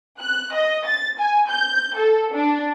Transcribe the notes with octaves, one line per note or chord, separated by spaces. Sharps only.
F#6
D#5
A6
G#5
G6
A4
D4